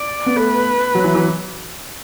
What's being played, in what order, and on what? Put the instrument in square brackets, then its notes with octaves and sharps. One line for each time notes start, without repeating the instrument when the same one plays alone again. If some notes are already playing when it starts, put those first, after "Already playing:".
Already playing: [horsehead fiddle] D5
[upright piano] B3
[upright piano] A3 [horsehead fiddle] B4
[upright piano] F#3
E3
E3